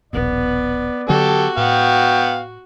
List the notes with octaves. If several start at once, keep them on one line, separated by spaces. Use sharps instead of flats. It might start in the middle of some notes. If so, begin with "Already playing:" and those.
D#1 A#1 B2 B3 D5
D3 F#3 B3 F#4 G4 A4
A2 B3 F5 G5